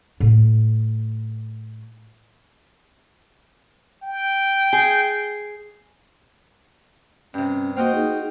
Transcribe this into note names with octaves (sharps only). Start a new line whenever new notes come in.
A2 A3
G5
G#4
G2 C3 C#4
A#3 F4 F#4 C5 D#5 G5
D#4 G#4